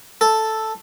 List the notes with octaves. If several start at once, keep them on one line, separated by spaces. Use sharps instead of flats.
A4